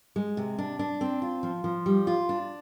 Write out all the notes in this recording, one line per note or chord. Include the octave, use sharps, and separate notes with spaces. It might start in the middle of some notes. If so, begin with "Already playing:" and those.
G#3
C3
D4
D4
C4
F4
F3
F3
G3
F4
D4